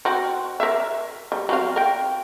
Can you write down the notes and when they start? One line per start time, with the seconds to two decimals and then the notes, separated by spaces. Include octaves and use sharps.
0.05 C4 F#4
0.60 A#4 E5
1.32 G3
1.49 F#3 C4 F5
1.76 A#4 G5